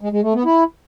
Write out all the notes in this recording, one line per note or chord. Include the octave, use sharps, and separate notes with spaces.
G#3
G#3
A3
B3
E4